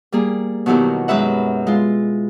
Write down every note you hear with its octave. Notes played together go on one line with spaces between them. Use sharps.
G3 A#3 G#4
B2 D#3 F#3 E4 G4 A#4
F#2 G#3 B4 E5 F#5
G#3 F4